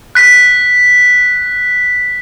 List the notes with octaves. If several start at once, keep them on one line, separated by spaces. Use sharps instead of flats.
F#6 B6